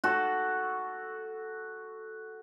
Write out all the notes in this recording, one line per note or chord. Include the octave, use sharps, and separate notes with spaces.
F#4 A4